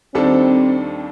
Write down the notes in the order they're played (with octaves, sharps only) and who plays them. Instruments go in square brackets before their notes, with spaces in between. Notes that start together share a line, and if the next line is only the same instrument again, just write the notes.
[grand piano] D#2 D#3 G3 D4 A4 [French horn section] C4